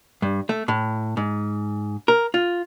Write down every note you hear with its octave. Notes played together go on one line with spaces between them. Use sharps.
G2
A3
A2
G#2
A#4
F4